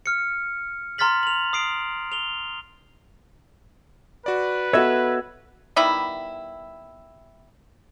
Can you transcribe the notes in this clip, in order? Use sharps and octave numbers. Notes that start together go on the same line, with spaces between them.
F6 C#7
A#5 C6 F6 A6 B6 F#7
F7 F#7
D#6 C7 D7
F7 G7
F#4 B4 D5
B3 F#4 A4 C#5 D#5 E5 E6 G#6
D#3 G3 B3 E4